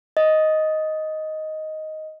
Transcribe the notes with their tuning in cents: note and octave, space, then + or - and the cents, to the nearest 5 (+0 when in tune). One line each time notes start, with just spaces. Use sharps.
D#5 +5